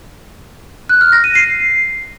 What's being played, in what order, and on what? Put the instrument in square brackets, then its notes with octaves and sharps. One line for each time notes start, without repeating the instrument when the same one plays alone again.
[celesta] F#6
F6
A#6
D#7
C7